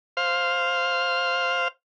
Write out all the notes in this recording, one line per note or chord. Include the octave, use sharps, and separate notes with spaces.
C5 F5